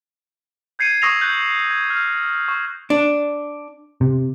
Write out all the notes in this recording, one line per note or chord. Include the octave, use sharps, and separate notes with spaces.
G6 G#6 C7 C#7 D#7
C#6 D#6 E6 A#6 C7 F7
E6 F#6 G6 A#6 F#7
G#6
F6
C#6
D4
C3